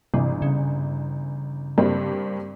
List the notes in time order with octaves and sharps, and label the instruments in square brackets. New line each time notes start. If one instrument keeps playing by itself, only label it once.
[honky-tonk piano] G1 E3 [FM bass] C3
[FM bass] C#3
[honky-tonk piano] G2 A#3 C4